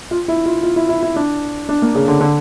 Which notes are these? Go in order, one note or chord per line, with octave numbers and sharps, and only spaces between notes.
F4
E4
F4
F4
E4
E4
E4
D4
D4
A#3
C#3
D3
D3